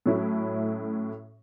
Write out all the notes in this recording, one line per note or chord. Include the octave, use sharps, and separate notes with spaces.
A2 F#3 A3 C#4 E4